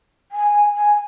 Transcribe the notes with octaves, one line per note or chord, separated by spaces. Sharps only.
G#5
G#5